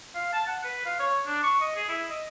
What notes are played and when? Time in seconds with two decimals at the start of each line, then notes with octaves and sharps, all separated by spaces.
0.15 F5
0.33 A5
0.47 F#5
0.64 B4
0.86 F5
1.00 C#5
1.26 D4
1.43 C#6
1.61 D#5
1.76 G#4
1.89 E4
2.10 D#5